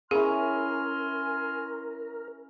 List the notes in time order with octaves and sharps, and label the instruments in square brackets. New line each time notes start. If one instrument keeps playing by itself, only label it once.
[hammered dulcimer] C#4 E4 [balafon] G#4 [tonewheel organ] A#4 [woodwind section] G#5 C6 F6